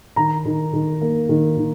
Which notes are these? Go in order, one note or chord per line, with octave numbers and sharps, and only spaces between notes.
D#3 A#5
D#3
D#3
A#3
D#3
D#3